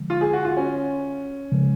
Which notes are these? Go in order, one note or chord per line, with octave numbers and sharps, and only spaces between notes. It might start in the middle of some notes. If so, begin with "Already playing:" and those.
Already playing: D3 F3 G#3
F4
G#4
F#4
F4
C#4
C#3 F3 G#3